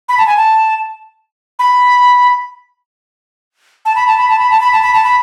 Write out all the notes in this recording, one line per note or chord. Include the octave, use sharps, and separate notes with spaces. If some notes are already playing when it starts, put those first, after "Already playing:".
B5
A5
G#5
A5
B5
A5
B5
A5
B5
A5
B5
A5
B5
A5
B5
A5
B5